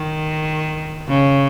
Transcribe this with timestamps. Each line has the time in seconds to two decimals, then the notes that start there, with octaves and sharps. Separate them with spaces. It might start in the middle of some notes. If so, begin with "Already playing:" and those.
Already playing: D#3
1.08 C#3